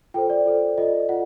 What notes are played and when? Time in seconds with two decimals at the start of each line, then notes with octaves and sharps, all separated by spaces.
0.14 F4 A4 C5 G5
0.30 D5
0.45 F4 A4 C5
0.77 F4 A4 D5 D#5
1.09 F4 F#5